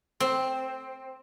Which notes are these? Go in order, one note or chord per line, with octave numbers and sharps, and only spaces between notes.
C4